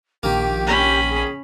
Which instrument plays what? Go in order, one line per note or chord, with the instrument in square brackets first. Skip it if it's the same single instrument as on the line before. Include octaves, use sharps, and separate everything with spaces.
[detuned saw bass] A#1 [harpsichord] D#3 A#3 [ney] G4
[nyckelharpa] C#4 B5
[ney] G#4